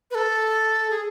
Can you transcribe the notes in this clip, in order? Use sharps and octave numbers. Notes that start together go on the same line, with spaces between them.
B4
A4
G#4